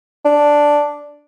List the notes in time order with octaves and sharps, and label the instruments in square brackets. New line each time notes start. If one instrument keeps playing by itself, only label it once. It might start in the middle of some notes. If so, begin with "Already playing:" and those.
[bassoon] D4